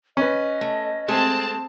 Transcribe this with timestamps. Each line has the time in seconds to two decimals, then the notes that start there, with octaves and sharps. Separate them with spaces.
0.17 C#4 B4 D#5
0.61 A3
1.08 G#3 A3 C4 G#4 A5